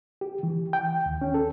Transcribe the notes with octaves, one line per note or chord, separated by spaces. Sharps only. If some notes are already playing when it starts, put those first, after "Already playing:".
G4
E3
G5
D#2
C#4
A4